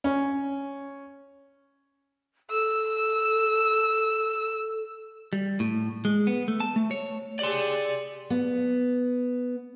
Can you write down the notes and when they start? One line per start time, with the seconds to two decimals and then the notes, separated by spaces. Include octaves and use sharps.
0.04 C#4
2.50 A4 E6
5.33 G3
5.60 A2
6.05 G#3
6.27 B3
6.48 A3
6.60 A5
6.76 A3
6.91 C#5
7.39 G4 G#4 D5 C6
8.30 B3